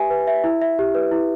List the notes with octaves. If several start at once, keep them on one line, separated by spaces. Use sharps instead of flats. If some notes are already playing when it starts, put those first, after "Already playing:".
Already playing: G4 B4 E5 G#5
B4
E5
E4
E5
G4
B4
E4